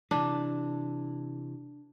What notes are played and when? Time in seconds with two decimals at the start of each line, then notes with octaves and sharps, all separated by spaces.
0.11 C3 E3 D4